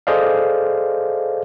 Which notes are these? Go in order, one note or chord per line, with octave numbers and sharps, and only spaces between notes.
G#4 A4 C5 D5 D#5 F5